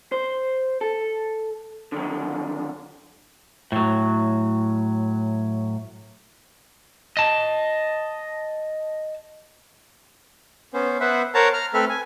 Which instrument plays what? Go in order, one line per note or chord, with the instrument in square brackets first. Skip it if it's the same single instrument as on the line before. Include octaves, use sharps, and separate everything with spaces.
[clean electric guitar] C5
A4
D3 D#3 F#3
[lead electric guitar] A2 F#3
D#5 A5
[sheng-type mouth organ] B3 C#4 C5
B3 B4 C5 E5 F#5
A#4 C5 C#5 F#5 A5 A#5
A#5 F6
A3 C4 A4 B4 E5 F6
G#5